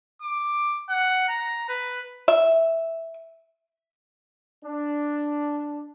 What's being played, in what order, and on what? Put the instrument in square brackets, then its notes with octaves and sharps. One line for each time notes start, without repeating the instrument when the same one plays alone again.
[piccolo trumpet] D6
F#5
A#5
B4
[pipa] E5
[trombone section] D4